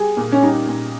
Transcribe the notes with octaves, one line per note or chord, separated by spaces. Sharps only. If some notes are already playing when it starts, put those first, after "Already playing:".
Already playing: G3 G#4
A#2
C#4
G3 D#4
A#2